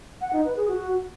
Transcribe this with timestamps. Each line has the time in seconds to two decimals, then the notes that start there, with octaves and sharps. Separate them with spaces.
0.21 F#5
0.33 D#4
0.45 B4
0.56 G#4
0.68 F#4